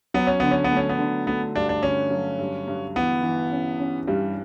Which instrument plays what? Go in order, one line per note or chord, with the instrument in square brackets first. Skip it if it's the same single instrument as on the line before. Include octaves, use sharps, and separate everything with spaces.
[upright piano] F#3 [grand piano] B3
[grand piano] C#4
[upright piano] D3 [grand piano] B3
[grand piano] C#4
B3
[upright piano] A3
[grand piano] C#4
B3
[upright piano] D3
[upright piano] A3 [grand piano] B3
[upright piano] G2 [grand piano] D4
[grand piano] D4
[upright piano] D3 [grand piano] C#4
[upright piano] F#3
G2
G2
[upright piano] E3 [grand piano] B3
[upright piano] E3
C#4
C#4
[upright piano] G2 [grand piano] G3